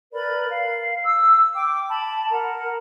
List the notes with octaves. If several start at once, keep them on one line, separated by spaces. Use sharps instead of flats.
A#4 B4 D5 B5
F5
E6
G5 D6
A5 B5
A#4 F#5 A#5